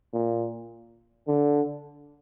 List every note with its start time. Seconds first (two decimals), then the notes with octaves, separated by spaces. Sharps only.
0.13 A#2
1.28 D3